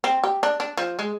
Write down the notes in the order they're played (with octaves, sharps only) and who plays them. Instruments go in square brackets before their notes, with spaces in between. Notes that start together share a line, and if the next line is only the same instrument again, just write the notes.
[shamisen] C4
G4
D4
D4
F3
G#3